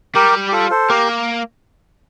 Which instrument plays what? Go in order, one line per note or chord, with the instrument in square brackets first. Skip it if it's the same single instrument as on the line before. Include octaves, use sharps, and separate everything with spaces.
[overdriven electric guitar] G3 [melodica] G4 A#4
[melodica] G4
F4 A4
A4 C5
[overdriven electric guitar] A#3 [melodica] G4 A#4